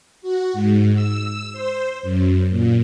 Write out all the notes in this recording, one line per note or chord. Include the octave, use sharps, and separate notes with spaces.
F#4
G#2
E6
C5
F#2
A#2